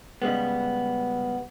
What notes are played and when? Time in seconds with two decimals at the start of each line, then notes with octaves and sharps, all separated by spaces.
0.22 C#3 G3 G#3 B3